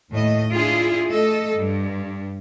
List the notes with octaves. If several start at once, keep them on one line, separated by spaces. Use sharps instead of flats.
D#2 A2 D#5
D4 E4 F4 G#4
A3 A4 D#5
G2